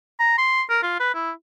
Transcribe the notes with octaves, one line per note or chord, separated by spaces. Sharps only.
A#5
C6
A#4
F4
B4
E4